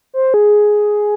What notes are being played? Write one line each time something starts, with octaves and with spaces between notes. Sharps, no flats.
C5
G#4